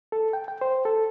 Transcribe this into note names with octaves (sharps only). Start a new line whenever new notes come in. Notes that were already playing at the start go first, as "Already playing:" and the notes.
A4
G5
G5
C5
A4